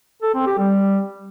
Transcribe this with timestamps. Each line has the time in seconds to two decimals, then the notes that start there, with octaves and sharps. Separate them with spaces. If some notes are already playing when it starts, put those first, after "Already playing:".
0.23 A4
0.35 C4
0.47 G4
0.58 G3